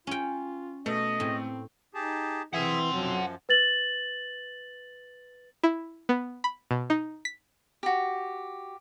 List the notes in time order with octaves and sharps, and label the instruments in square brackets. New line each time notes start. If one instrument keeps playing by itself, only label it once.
[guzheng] C#4 G5 [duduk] F4
[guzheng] B2 [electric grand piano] A3 [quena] D#5
[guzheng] A2 [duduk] C4
[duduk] D#4 [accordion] G4 G#4 A5
[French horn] E3 [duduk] C4 [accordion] G#4 E5 G#5 [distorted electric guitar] F#5 C6
[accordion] F#2 F3 [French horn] F#3
[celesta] B4 A6 F#7
[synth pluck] E4
B3
B5
B2
D#4
B6
[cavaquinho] F#4 G4